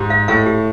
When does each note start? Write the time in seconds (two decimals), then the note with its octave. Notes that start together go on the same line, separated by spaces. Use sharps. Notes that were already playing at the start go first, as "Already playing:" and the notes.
Already playing: G#2 G4
0.10 F5
0.28 A2 F5
0.46 G4